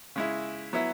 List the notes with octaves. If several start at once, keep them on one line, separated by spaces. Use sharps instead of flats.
C#3 G#3 E4
F#3 B3 E4